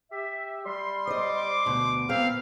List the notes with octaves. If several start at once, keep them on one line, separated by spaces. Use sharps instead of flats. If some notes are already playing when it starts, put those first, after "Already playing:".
G4 E5
G3 C6
C5 D#5 D6
D2 B2
A#2 B3 C4 F5